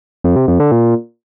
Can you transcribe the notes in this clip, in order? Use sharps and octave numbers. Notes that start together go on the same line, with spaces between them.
F2
C3
F2
D3
A#2